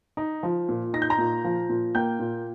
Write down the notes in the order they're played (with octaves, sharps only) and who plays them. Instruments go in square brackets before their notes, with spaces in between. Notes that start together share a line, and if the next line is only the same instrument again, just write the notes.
[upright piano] D#4
F3
A#2
D#4 A#6
G6
A#5 A#6
A#2
F3
A#2
A#3 G5 G6
A#2